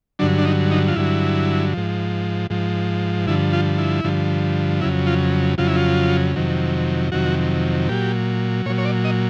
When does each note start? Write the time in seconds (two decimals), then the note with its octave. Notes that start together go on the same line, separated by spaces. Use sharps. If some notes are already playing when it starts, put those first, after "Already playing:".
0.19 G2 D3 F#3 D4
0.38 D4
0.45 D#4
0.71 D#4
0.88 F4
0.96 G2 D3 F#3 E4
1.73 G#2 F3
2.50 G#2 F3
3.27 G2 D3 F3 E4
3.53 F4
3.78 E4
4.04 G2 D3 F3
4.81 F2 C#3 F#3 E4
5.07 F4
5.58 F2 C#3 F#3 F4
5.67 E4
5.76 F4
6.36 F2 C3 D#3 F#3
7.12 F2 C3 D#3 F#3 F#4
7.89 A#2 F#3 G4
8.66 A#2 C#5
8.70 F#3
8.78 C#5
8.85 D5
9.05 D#5